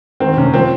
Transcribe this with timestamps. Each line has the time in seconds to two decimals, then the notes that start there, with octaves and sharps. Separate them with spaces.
0.20 D#3 C4
0.37 C3 C#4
0.54 F3 C4